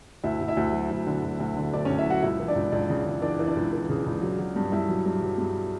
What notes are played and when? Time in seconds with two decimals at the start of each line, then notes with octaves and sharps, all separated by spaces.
0.24 D2 E4 E5
0.41 D2
0.48 E4 E5
0.57 D2
0.73 F#3
0.90 D2
1.07 D3
1.24 D2
1.40 D2
1.56 D3
1.73 D2 D4 D5
1.85 D2 C#4 C#5
1.98 E4 E5
2.06 F#3 F#4 F#5
2.22 C#2 E4 E5
2.40 E3
2.48 D4 D5
2.56 C#2
2.72 C#2 D4 D5
2.89 C#3
3.05 C#3
3.22 E3 D4 D5
3.39 E3
3.47 D4 D5
3.56 C#2
3.73 E3
3.90 C#3
4.06 C#2
4.22 F#3
4.39 F#3
4.56 G2
4.72 G2 E4 E5
4.89 F#3
5.05 G2
5.22 F#3
5.38 G2